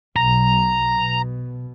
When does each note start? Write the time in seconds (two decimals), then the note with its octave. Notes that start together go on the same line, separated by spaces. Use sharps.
0.16 B1 A#5
0.96 B2